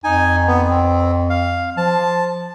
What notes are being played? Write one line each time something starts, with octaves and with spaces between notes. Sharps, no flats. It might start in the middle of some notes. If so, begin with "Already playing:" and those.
F2 D#4 G#5
B3
C4
F5
F3 A5